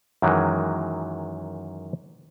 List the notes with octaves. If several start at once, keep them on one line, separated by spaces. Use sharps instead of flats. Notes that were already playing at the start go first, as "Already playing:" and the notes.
F#2 D#3 E3 F#3 G#3